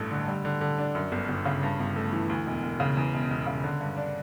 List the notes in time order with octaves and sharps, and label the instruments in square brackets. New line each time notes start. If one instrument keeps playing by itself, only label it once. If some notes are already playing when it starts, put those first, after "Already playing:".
Already playing: [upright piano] A1 G2 A3
D3
G3
D3
D3
D4
F#2
G1
G1
C#3
G2
G1
A3
E3
D2
E1
E1
C#3
E2
E1
E1
C#3
D3
G2
D4